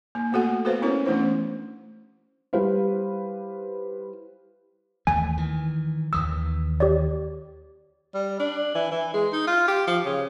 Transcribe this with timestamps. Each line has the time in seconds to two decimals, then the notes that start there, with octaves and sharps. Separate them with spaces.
0.15 A#3
0.32 A3 B3 F#4 A4 F#5
0.65 F#4 A4 B4 C5 F5
0.82 B3 C#4 E4 A#4 C#5
1.06 E3 A3 C#4 D4 E4 C5
2.53 G3 E4 B4 C5 F5
5.07 D#2 E3 A3 G#5
5.37 D#3 E3
6.13 D#2 D#3 E3 D#6 E6
6.80 G4 C#5 D5
8.14 G3
8.39 D4
8.74 E3
8.91 E3
9.14 G#3
9.33 D#4
9.47 F4
9.68 G4
9.87 F3
10.05 C#3